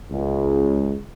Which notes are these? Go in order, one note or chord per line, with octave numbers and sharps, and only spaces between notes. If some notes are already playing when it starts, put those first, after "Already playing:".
C#2